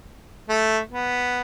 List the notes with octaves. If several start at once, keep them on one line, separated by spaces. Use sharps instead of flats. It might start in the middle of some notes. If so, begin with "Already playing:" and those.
A3
B3